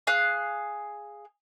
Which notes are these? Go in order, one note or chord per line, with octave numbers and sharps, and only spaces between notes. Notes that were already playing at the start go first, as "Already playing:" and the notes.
G#4 F5 F#6